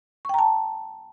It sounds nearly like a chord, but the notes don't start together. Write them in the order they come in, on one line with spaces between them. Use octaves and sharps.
C#6 G5 A#5 A5